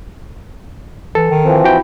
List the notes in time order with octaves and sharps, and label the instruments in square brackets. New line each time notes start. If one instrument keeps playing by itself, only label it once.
[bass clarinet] E3 [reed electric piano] A4
[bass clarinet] D#3
[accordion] E3 F3 C4
[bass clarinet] E4 [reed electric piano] F#4 G5